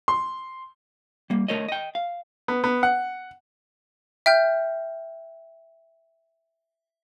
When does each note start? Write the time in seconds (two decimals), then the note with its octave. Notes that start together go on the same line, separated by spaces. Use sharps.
0.08 C6
1.30 G3 A#3
1.48 A3 A#4 C#5 D#5
1.68 D#5 G5
1.95 F5
2.48 B3
2.64 B3
2.83 F#5
4.26 E5 G5 F6 G6